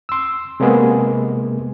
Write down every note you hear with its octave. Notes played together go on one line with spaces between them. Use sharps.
C6 E6
C3 G#3 A#3 B3 G#4